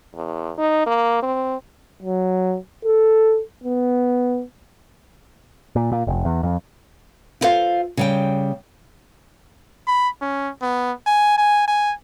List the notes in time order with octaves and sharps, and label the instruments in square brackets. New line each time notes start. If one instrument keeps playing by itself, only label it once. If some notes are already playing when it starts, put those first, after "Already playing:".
[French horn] E2
D#4
A#3
C4
[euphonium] F#3
A4
B3
[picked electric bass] A#2
A#2
F1
E2
F2
[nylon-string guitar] E4 F4 A4 C5 F5
C#3 G3 G5
[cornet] B5
C#4
B3
G#5
G#5
G#5